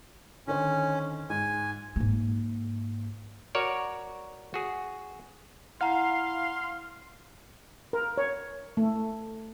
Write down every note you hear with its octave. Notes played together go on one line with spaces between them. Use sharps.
D3 D#3 C#4 C5
G#2 G#5
G#2 A#3
F#4 A#4 C#5 D5
F#4 G#4
E4 F5 F#5 A#5 C6
A#4
C#5
A3